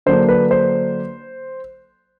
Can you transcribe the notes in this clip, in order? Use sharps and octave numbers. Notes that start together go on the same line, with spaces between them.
D3 F#3 A#3 D4 C5
B4
C5